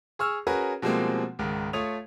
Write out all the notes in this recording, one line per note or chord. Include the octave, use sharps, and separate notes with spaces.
G#4 C#6 E6 F6
C#4 F#4 G#4 A#4 B4
B2 F3 G3 G#3 A#3 C4
C#2 G#2 D#3
A3 F4 C#5 D#6 F7